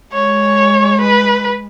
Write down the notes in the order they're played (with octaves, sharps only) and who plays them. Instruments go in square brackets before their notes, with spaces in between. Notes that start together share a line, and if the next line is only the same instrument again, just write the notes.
[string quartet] G#3 [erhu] C#5
[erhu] B4